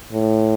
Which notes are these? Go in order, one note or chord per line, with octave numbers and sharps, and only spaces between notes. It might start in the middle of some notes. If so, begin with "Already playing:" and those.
A2